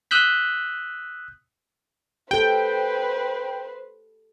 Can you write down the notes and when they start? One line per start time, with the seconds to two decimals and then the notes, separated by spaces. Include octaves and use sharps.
0.11 D#6 E6 F#6 G6 B6
2.31 G4 A4 B4 C5 G5